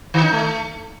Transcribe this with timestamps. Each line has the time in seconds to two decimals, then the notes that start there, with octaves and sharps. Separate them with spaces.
0.14 D#3
0.23 D#4
0.33 A3